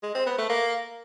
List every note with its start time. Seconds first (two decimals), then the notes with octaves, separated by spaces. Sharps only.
0.03 G#3
0.15 C4
0.26 B3
0.38 A3
0.50 A#3